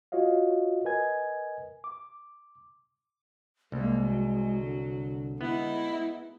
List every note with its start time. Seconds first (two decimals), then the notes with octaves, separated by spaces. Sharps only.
0.12 F4 F#4 C#5 D#5 F5
0.85 A#4 B4 D#5 G#5 G#6
1.84 D6
3.72 C2 G#3 A#3
4.06 F#3
4.58 D3
5.41 G#3 B3 D#4 E4